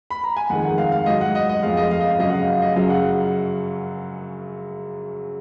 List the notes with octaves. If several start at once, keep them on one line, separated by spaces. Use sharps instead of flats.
B5
A#5
G#5
F2 D#3 G#3 F#5
F#5
F5
F5
G#2 F#3 D#5
F#5
D#5
D#5
F2 F3 G#3 F5
D#5
F5
D#5
F5
F#2 C#3 F#3 D#5
F#5
F5
F5
D#5
F#2 C#3 F#3 F5
F#5